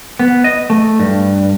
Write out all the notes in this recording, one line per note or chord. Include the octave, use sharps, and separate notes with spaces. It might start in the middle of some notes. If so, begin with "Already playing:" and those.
B3
D#5
A3
G2